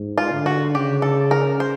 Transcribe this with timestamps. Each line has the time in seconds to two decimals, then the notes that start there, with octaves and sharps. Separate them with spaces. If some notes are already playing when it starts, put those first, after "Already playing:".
Already playing: G#2
0.18 F4
0.31 D3
0.46 F#4
0.75 C#3 G4
1.02 A4
1.31 A#4
1.60 C5